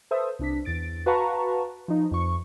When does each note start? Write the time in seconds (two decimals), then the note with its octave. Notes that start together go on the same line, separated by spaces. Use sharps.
0.11 A4 B4 C5 E5 D#6
0.39 C2 D4 B6
0.65 E2 A6 D7
1.06 F#4 B4 F5 A5 A#5 C#6
1.88 F3 D#4
2.11 F2 C#6